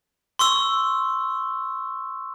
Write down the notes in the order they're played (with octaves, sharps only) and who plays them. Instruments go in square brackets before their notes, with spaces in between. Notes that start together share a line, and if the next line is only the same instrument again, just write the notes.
[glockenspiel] C6 C#6 E6